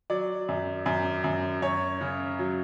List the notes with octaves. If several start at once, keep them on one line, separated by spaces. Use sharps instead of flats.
F#3 D5
F#2
F#2
F#2
F#2 C#5
C#3
F#3